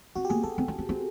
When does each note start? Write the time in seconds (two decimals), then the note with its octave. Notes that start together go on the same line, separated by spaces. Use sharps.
0.15 C4 F#4
0.25 G4
0.30 A#3 G#4
0.43 C4 A4
0.58 C4
0.68 C#4
0.79 C4
0.89 C4